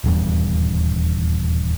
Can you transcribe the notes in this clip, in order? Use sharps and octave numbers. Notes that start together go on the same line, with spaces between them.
D#1 E2 G2